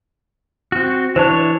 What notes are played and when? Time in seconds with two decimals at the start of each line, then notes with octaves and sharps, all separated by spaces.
0.72 C4 F#4
1.16 E3 D4 C5 C#5 A5